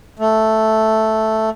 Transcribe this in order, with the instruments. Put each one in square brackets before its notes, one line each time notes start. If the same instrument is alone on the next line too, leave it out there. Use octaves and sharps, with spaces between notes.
[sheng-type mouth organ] A3